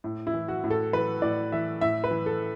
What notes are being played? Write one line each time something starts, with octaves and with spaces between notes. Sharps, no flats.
A2
E4
E3
F#4
A2
A4
E3 B4
A2 D5
E3 E5
A2 E5
B4
E3
A4